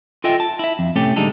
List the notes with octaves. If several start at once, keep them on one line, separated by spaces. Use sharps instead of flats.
F4 A4 D#5 E5 G5 G#5
A5
E4 E5
F2
A2 C3 A3 C#4 G4
D3 G3 G#3 D#4 A4